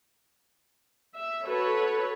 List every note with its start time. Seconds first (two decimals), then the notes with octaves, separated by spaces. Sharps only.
1.14 E5
1.47 F#4 A4 B4 C#5